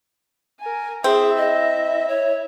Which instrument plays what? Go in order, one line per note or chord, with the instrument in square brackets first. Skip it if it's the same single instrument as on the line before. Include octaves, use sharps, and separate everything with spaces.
[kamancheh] A#4 G#5
[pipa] C4 [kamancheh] E4 E5 [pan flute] G#4
[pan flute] D#5
C#5